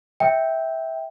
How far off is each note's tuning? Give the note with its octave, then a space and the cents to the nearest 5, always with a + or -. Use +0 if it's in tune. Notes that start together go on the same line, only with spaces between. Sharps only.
E5 -15 G5 +0